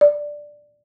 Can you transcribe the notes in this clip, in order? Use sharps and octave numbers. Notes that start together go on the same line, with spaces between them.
D5